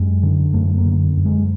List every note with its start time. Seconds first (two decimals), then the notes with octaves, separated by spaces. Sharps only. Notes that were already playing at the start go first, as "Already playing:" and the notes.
Already playing: F#2 G#3
0.23 D3
0.54 F#2 A3
0.78 A#3
0.86 D3
1.17 F#2
1.25 G#3